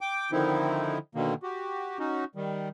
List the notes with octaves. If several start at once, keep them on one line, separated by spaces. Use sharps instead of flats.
G5 D6
D3 D#3 F3 C4 D#4 E4
B2 D3 D#3 A#3
F#4 G4
C#4 D#4 F#4
D#3 G3